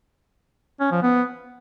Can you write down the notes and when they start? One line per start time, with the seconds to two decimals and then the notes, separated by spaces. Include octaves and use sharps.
0.80 C#4
0.91 F3
1.02 B3